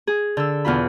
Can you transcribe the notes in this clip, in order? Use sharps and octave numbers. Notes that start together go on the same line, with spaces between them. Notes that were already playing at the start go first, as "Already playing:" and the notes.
G#4
D3 E6
E2 B2 F4 B5